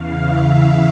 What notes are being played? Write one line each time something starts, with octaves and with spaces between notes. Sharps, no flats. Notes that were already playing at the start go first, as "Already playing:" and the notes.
Already playing: E2 C#3 E3 F5
E5